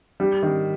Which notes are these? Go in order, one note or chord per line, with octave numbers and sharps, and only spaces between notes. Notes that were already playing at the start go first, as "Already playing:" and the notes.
G3
D#3